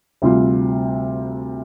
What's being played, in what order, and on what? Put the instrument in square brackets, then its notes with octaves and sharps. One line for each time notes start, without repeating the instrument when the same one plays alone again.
[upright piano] D2 C3 G3 C4 F4